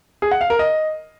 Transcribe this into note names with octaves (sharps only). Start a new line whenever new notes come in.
G#4
F#5
F5
A#4
D#5